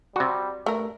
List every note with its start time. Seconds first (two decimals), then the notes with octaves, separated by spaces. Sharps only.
0.16 C3 G3 F#4
0.66 G2 A3 A#4